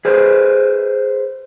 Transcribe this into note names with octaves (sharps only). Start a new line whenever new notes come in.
G#4 B4 C5